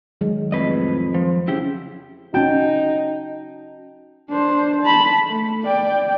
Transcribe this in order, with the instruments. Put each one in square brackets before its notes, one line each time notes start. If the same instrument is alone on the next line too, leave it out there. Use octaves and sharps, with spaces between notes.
[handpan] D#3 F#3 G#3
[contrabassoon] F2 [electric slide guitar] A2 B4 D#5
[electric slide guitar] F3 [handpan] C5
[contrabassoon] C#3 [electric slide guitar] E4 G4
[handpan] C#4 F#4 [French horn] D#4 [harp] G5 A5
[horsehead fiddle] D4 C5
A5 B5
A3
D5 G5